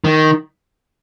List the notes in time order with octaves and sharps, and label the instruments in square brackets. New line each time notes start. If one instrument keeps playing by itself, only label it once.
[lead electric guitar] D#3